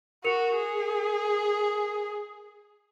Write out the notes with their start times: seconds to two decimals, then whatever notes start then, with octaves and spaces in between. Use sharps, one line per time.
0.24 F#4 A#4 C#7 F7
0.56 G#4